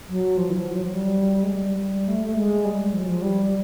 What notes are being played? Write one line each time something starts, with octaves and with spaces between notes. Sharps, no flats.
F#3
F3
E3
F3
F#3
F#3
G3
G#3
G3
G3
A3
A3
G#3
G3
F3
F#3
F3
G3